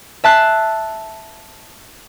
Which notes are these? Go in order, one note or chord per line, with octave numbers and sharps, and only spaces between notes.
E5 A5 F#6 C7